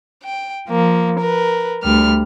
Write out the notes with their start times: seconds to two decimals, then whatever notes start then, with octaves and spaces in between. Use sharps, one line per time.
0.24 G5
0.68 F3 A#3
1.19 A#4 B4
1.82 D2 G3 F6